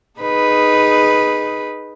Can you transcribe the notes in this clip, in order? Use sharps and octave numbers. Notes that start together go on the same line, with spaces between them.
D#4 G#4 B4